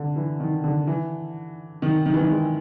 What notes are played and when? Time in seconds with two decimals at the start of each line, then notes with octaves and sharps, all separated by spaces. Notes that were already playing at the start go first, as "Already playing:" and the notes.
Already playing: D3
0.16 E3
0.40 D#3
0.64 D3
0.87 E3
1.82 D#3
2.06 D#3
2.14 E3
2.21 D#3
2.30 G#3